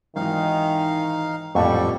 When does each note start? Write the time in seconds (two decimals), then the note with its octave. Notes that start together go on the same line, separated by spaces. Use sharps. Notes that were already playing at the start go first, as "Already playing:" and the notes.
0.16 G#1 D#3 E3 D#4 F5
1.55 A1 F2 A#2 G3 F#4 A4 C#6